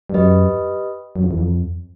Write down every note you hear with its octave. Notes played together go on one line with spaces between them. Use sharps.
G2
F#2 G4 B4 D#5
F#2
F2
E2
F2